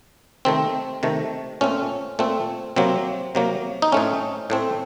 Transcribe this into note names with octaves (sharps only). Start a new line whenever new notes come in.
C3 D#3 A3 C4
C3 D#3 A3
A#2 A3 C4 C#4
A#2 A3 C4
C3 F#3 A#3 C4
C3 F#3 A#3
D#4
A2 A3 C4 C#4
A2 A3 C4